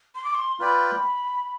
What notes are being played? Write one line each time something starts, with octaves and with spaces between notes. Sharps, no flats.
C6
D6
C6
F4 B4 D5 G5 B5